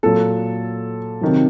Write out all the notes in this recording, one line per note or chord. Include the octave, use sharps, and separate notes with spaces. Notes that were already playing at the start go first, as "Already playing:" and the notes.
A#2 F#3 A4
C3 D#3 F#3